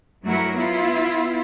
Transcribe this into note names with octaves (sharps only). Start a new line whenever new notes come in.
G2 F#3 A3 E4 F#4 A#4
B3 E4 F4